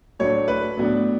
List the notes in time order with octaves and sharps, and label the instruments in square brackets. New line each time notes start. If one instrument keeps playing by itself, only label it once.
[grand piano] A2 F#3 A3 D4 C#5
B4
A2 F#3 B3 D4